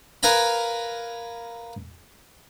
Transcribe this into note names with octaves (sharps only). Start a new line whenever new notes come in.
A#4 B4 F5 G#5 A#5 B5